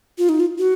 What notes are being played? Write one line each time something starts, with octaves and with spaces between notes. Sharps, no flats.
F4
D#4
F4
F#4